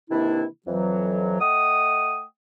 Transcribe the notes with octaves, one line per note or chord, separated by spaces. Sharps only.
C3 D#3 E3 A#3 D4 E4
F2 E3 F#3
A3 D#5 F#5 G5 D#6